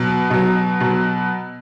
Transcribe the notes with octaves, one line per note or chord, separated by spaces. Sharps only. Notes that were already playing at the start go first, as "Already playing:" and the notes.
Already playing: B2 F#3
B2 F#3
B2 F#3